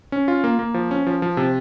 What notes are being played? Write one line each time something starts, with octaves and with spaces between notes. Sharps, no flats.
C#4
F4
A#3
A#3
F3
C#4
F3
F3
C3